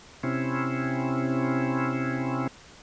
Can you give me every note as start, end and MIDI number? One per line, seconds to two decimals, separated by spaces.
0.23 2.47 48
0.23 2.47 60
0.23 2.47 61
0.23 2.47 64